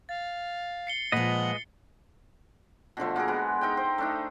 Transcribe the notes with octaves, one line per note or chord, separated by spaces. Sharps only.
F5 A6
C7 C#7 G7
A#2 F3 G#3 B4 D#5 F#5
B2 D3 F3 A3
A#3 F#4 G#4 A#4
G#3 B3
D#4 A#4 E5 G5
C5
A3 D4 D#4